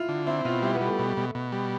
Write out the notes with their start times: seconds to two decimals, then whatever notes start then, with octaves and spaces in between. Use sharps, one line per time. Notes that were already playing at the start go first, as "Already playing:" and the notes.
Already playing: E4 F4
0.09 D3
0.26 C4 E4
0.45 B2 F4
0.63 G3 E4
0.75 B3
0.81 G3
0.86 A3
0.99 B2
1.17 B2
1.35 B2
1.52 G3